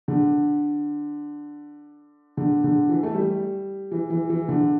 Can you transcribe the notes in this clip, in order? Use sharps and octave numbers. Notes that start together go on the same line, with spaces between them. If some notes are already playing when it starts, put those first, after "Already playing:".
D3
D3
D3
E3
A3
G3
E3
E3
E3
D3